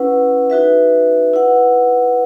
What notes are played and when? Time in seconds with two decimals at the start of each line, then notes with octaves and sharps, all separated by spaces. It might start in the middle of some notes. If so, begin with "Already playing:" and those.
Already playing: C#4 E4 B4 F#5
0.50 D#4 F#4 B4 E5
1.34 E4 B4 F#5